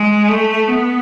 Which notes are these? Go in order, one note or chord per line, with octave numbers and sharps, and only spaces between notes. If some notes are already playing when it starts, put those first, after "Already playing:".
Already playing: G#3
A3
B3